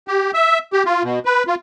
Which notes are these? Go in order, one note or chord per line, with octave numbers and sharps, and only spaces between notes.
G4
E5
G4
F4
B2
B4
F4